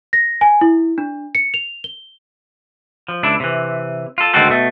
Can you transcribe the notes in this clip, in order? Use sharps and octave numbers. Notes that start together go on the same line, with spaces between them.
A#6
G#5
E4
D4
C#7
F7
G7
F3
C#2 D4 E4
C3 E3
F4 A4
D2 D#3 G#3 C4 F#4 A4
B2 A3